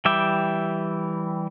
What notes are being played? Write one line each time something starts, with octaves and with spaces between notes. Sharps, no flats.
E3 G3 E5 G5 D6